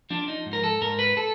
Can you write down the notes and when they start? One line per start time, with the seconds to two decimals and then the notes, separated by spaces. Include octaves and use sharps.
0.10 F3 D4
0.28 D#4
0.46 G#2
0.53 A#4
0.64 A4
0.81 G#2 A#4
0.99 B4
1.17 A4